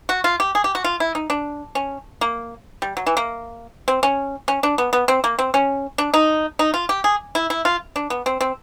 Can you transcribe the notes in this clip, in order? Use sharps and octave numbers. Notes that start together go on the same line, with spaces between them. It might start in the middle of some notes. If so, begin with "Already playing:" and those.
F#4
F4
G4
G#4
G4
F#4
F4
E4
D#4
D4
C#4
A#3
G3
F#3
E3
A#3
C4
C#4
C#4
D4
B3
B3
C4
A#3
C4
C#4
D4
D#4
D#4
F4
G4
G#4
E4
E4
F4
D4
B3
C4
C4